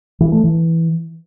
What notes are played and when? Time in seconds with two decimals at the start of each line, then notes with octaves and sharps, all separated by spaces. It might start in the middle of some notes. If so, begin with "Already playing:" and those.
0.20 E3
0.32 A3
0.44 E3